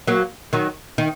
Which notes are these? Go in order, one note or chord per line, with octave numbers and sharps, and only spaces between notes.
F#3 A#3
D#3 F#3
D#3